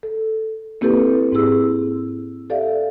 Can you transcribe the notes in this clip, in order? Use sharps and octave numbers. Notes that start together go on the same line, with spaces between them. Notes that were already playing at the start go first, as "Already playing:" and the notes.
A4
A#3 C4 E4 G4 A4 B4
G#2 C4 E4 G#4 E6
G4 A4 D5 E5 F5